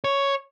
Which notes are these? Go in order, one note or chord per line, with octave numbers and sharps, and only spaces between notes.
C#5